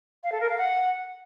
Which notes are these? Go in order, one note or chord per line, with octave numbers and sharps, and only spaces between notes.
F5
A4
A#4
F5
F#5